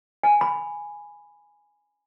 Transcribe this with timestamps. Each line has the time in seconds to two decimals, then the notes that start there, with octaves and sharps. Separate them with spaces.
0.23 G#5
0.41 B5